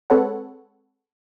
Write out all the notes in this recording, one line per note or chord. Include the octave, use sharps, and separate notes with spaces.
G#3 C4 A4 B4 C#5 F#5